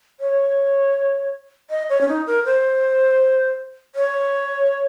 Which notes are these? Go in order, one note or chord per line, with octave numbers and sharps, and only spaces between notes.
C#5
D#5
C#5
C#4
D#4
A#4
C5
C#5